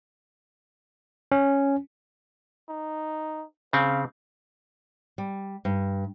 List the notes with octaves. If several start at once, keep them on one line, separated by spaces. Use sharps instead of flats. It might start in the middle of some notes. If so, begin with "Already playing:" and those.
C#4
D#4
C#3 C4 F5
G3
G2